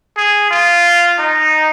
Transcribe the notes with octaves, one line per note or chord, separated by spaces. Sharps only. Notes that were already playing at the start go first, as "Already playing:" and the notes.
G#4
F4
D#4